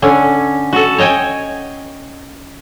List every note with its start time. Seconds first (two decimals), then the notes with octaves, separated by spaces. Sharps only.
0.02 D3 C#4 G#5
0.73 F#4 A4
0.98 C#5 D#5 G5 G#5